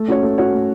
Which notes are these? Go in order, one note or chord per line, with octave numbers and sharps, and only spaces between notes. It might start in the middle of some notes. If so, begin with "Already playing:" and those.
Already playing: A3
C#4 F#4 C#5
A3
C#4 F#4 C#5
A3